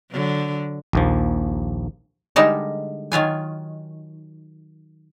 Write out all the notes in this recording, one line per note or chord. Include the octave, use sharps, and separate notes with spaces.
D3 F#3
A#1 D#2 F3
D3 G3 G#3 D#4 A#4 A5
D#3 F#3 F4 G#5